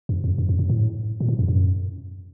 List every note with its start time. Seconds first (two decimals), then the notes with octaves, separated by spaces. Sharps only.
0.09 F#2
0.24 F2
0.38 F#2
0.49 F2
0.59 F#2
0.70 A2
1.20 A#2
1.29 A2
1.39 F2
1.48 F#2